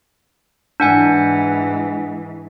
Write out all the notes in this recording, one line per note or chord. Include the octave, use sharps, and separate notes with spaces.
G#2 E3 D4 F#5 G#5